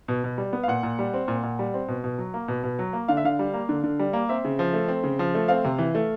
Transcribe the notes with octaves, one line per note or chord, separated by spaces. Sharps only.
B2
B2
G3
B3
F5
A#2 F#5
A#2
G3
C4
A#2
A#2
G3
C4
B2
B2
F#3
A#3
B2
B2
F#3
A#3
D3 F5
E5
D3 F5
G3
A#3
D3
D3
G3
A#3
C4 E5
C#3
F3
A3
C4
C#3
F3
A3
C4 F5
C3
E3
A3